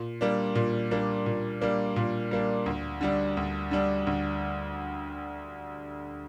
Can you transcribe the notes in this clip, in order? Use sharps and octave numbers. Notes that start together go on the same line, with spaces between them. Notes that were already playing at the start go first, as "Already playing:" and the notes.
Already playing: A#2
G3 A#3 D4
A#2
G3 A#3 D4
A#2
G3 A#3 D4
A#2
G3 A#3 D4
D2
D3 G3 D4
D2
D3 G3 D4
D2